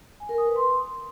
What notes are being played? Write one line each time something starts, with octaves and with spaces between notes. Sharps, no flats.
G#5
A#4
D#6
B4
C6